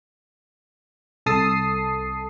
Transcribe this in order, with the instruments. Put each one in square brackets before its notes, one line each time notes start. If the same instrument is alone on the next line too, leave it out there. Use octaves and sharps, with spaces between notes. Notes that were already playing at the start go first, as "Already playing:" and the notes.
[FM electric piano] C2 A4 A5 D#6 C7